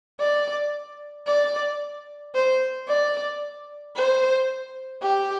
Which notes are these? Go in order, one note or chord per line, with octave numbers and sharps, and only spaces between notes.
D5
D5
C5
D5
C5
G4